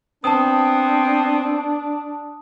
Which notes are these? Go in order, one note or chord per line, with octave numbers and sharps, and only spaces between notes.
B3 C4 D4 A5 D#6